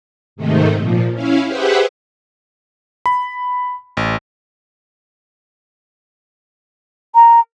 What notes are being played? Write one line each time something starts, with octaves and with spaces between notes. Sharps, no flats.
G#2 C3 D#3 A3 D#4
A#2 F3
C#4 E4 F5
G4 G#4 B4 C5 E5 F#5
B5
A1
A#5